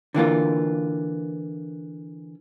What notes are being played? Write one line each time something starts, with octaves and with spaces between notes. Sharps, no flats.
D3 E3 A#3 F4